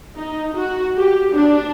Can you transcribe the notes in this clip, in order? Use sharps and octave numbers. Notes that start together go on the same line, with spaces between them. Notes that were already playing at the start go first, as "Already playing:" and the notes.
D#4
F#4
G4
D4